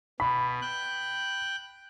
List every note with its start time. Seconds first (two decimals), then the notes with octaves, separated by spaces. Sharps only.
0.20 B2 B5
0.61 G5 F#6